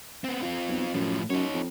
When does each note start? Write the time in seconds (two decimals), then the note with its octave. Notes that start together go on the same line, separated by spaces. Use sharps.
0.24 B3 C4
0.43 C4 F4
0.68 B1
0.94 F#2 A2 F3
1.30 F#2 D#4 C#5
1.53 F2